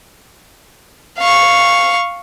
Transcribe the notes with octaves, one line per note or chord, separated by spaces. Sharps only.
F5 C#6